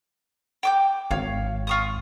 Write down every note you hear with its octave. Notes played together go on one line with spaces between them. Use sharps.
G5 D6 G6
G#1 C#5 F5
F4 C#6 D#6